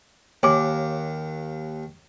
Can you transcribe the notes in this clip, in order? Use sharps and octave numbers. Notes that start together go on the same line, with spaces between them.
D#2 C#5 G#5 D6